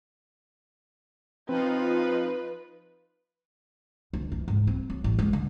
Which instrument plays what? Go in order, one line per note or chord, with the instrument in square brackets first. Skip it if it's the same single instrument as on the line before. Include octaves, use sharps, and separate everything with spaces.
[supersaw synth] F3 D#4 F4 [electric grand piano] C4 [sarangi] B4
[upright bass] D2
E3
G#2
C4
F#3
A1
G#3
D3